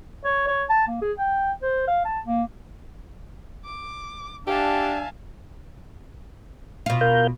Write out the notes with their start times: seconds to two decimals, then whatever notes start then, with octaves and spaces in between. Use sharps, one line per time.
0.24 C#5
0.47 C#5
0.69 A5
0.88 A#3
1.01 G#4
1.18 G5
1.62 C5
1.88 F5
2.05 A5
2.26 A#3
3.65 D6
4.47 D4 G4 E5 F5 G#5 A5
6.86 B2 F4
7.01 A#4 F5 G6